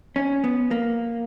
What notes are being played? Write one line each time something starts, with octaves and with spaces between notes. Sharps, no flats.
C#4
B3
A#3